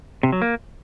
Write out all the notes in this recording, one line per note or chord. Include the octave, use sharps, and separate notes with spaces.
C3
F#3
A#3